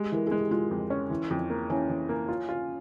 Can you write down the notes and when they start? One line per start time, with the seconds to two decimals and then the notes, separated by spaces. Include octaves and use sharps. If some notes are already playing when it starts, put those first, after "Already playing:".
Already playing: G#3 G4
0.12 E3 A#4
0.27 G#3 G#4
0.39 G4
0.51 G#3 F4
0.71 F2
0.90 C#4
1.10 E3
1.31 F2
1.50 A#3
1.70 E3 C#4
1.89 E3
2.09 A#3
2.28 F4
2.49 F4